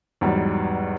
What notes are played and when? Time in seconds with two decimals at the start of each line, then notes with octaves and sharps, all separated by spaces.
0.21 E2 G#2 F#3 G3